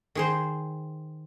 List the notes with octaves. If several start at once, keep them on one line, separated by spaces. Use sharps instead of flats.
D#3 G#4 C5